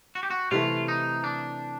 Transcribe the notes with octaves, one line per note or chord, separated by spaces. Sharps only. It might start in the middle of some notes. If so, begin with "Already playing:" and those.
F#4
G4
F#4
C3 E3 A3 F4
D#4
D4